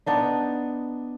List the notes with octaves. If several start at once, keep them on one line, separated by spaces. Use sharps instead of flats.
B3 D4 D#4